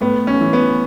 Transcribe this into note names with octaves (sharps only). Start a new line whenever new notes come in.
A2 B3
C#4
E3
B3